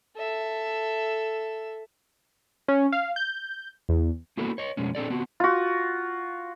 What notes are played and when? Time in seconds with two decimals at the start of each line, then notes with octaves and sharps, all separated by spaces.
0.16 A4 E5
2.68 C#4
2.92 F5
3.16 G6
3.89 E2
4.37 A#3 B3 E4 F#4 A4 A#4
4.58 C#5 D#5
4.77 F2 B2 G#3 C#4
4.95 C4 D4 A4 D5
5.10 B3 C4 F#4
5.40 F4 F#4